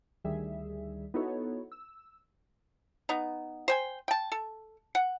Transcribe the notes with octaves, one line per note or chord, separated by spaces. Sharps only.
D2 D#3 G3 G#4 E5
B3 D#4 E4 F#4 A4 C#5
E6
B3 D#4
C5 G5 G#5
G5 A5
A4
F#5